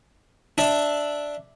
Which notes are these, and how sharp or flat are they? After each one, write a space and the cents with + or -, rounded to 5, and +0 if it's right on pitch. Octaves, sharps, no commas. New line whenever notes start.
D4 +0 E5 +0